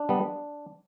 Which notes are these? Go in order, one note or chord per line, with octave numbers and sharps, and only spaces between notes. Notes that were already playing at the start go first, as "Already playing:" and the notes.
Already playing: D4
G3 B3